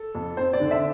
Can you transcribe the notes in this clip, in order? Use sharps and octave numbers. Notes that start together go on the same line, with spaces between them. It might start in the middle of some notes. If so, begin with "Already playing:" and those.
Already playing: A4
F2
C4 C5
D5
D3
E5